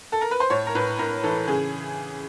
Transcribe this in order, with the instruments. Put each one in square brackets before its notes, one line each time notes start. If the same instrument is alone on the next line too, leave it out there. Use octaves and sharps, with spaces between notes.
[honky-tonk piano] A4
A#4
B4
C5
A2 C#5
A#4
A2 B4
A2 A#4
E3 A4
C#3 G#4